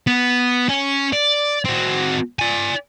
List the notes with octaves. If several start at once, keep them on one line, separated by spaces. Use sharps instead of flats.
B3
C#4
D5
C4 F#4
D5 G#5